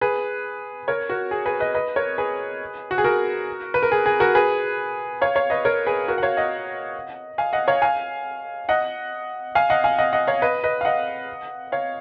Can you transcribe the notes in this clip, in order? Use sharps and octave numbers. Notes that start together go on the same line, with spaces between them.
G#4 B4
A#4 C#5
F#4 A#4
G#4
G#4 B4
B4 D#5
B4 D#5
A#4 C#5
G#4 B4
F#4
G#4
F#4 A#4
B4
A#4
G#4
G#4
F#4 A#4
G#4 B4
C#5 F5
C#5 F5
B4 D#5
A#4 C#5
G#4 B4
F#4 A#4
F#5
C#5 F5
D#5 F#5
F5 G#5
D#5 F#5
C#5 F5
F5 G#5
D#5 F#5
F5 G#5
D#5 F#5
F5 G#5
D#5 F#5
D#5 F#5
C#5 F5
B4 D#5
B4 D#5
F5
D#5 F#5
C#5 F5